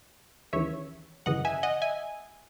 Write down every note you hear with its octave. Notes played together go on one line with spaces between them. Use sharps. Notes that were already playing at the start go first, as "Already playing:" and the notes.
D#2 C#3 E3 C#5 E5
G#1 F#2 C#3 E3 D#5 F#5
E5 G#5
D#5 F#5
E5 G#5